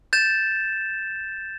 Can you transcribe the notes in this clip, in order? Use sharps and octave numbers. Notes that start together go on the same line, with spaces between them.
G6 A6 E7